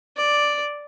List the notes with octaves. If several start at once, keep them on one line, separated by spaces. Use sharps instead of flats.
D5